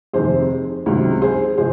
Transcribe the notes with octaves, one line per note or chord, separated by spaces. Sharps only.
F2 C3 D#3 G#4 C5
C#2 C3 D#3 F#3
G#4 C5
C3 F3 G#3 G#4 C5